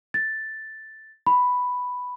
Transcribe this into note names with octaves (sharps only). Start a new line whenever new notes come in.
A6
B5